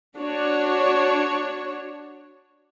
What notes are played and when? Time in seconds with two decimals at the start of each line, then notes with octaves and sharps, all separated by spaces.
0.18 D4 F#4 C#5